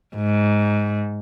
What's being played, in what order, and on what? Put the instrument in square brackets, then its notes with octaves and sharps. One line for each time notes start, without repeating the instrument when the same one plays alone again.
[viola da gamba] G#2